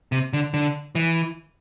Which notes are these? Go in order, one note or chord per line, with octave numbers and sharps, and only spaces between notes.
C3
D3
D3
E3